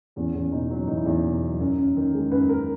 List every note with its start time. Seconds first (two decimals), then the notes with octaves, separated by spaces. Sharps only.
0.16 E2 C#4
0.35 E2 C#4
0.52 B2 D#4
0.70 F#3 C#4
0.88 E2 D#4
0.97 E4
1.05 E2 D#4
1.24 B2
1.42 F#3
1.60 F#2
1.78 F#2
1.97 D#3
2.14 G#3
2.31 F#2 B4
2.49 F#2 A#4